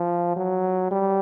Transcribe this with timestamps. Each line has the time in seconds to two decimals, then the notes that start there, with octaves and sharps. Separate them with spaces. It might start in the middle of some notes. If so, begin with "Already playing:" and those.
Already playing: F3
0.36 F#3
0.91 G3